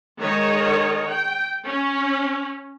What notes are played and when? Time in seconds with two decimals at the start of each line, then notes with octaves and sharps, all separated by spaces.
0.19 D#3 G#3 C#5 D#5
1.06 G5
1.64 C#4